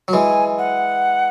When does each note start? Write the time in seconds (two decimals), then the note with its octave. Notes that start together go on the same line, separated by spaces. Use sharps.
0.08 F#3
0.13 E3 G#3 G#5
0.58 F#5